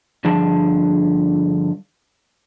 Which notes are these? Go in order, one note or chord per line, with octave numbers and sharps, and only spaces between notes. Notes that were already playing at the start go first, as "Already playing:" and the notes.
G2 D3 F3 G#4 A5